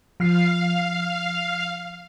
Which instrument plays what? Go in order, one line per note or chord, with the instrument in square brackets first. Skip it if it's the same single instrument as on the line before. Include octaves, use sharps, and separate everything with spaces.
[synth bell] F3 F6 C7 [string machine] F5